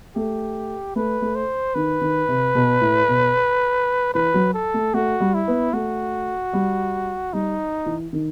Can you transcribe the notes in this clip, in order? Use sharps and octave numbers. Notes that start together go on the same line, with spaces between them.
A3 G4
A3 B4
A3
C5
D#3 B4
D#3
C3
B2
A2
B2
E3 B4
F#3
A4
A3
A3 F#4
G3
E4
B3
A3 F#4
G3
G3 D#4
E3
D#3